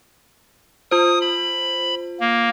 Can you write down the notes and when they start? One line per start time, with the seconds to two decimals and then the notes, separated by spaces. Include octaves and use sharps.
0.91 F4 C5 D#6
1.21 B5
2.20 A#3